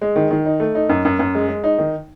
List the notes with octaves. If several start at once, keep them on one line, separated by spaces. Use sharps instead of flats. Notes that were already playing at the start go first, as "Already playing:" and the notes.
G#3
D#3
D#3
D#4
A3
D#4
F#2
F#2
F#2
G#3
G#3
D#4
D#3